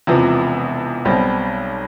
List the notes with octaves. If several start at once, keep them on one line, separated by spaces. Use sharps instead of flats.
E1 E2 C3 F3 B3
B1 B2 G3 C4